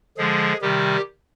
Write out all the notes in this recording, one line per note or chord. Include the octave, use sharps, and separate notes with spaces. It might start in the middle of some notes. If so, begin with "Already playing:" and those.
D3 F3 G#3 G#4
C3 D#3 G3 G4